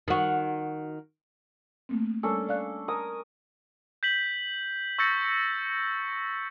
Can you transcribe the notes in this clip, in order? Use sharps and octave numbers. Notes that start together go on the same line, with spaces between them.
D#3 F#4
A3 A#3 C4
G3 C#4 D4 A4 A#4 E6
D5 F5 F#6
A#4 G#5 D#6
G6 B6 F#7
C#6 E6 G6 A6 A#6 C#7